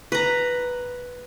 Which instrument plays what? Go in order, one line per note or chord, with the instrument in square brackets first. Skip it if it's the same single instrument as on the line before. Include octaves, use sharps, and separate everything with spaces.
[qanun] B4 A#5